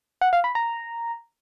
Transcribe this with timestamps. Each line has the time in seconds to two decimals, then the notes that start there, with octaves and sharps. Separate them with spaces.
0.21 F#5
0.33 F5
0.44 B5
0.55 A#5